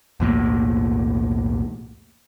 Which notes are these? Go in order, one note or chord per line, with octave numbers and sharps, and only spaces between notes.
B1 E2 A2 A#3